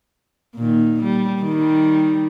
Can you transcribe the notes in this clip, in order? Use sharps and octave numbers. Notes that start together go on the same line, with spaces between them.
A#2 D#3
G3
D#3 G3